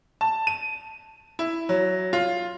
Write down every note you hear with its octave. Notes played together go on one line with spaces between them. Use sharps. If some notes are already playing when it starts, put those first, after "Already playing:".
A5
D#7
E4
F#3
F4